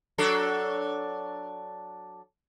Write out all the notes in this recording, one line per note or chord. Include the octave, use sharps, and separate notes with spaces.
F#3 D4 A4